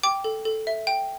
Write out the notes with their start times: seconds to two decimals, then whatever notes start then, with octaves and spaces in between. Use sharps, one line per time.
0.03 G5 D6
0.24 A4
0.45 A4
0.67 E5
0.87 G5